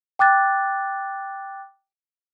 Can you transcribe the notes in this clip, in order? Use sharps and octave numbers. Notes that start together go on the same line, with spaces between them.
G5 D6 F#6 A6